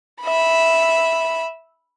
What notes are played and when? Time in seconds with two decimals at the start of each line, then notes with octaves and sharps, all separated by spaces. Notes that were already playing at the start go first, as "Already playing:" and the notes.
0.22 E5 B5